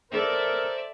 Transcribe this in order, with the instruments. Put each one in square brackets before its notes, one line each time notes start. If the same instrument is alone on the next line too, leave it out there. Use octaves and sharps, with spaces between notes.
[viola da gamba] A4 [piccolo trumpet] A#4 [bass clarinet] C5 [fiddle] D5 E5